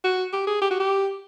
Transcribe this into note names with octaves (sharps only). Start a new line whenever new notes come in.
F#4
G4
G#4
G4
F#4
G4